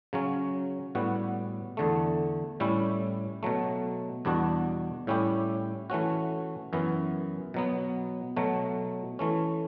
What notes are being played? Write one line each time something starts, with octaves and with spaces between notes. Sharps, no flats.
C#3 F#3 C#4
A2 G3 B3 F#4
E2 D3 A3
A2 G3 C#4 E4
B2 F#3 A3
E2 B2 G3 D4 F#4
A2 G3 C#4 E4 G4
E3 A3 C#4 F#4
F#2 E3 B3
B2 F#3 B3
B2 F#3 A3
E3 A3 C#4